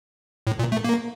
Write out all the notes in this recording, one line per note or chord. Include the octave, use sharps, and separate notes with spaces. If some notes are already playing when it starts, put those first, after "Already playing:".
A2
A#2
A3
A#3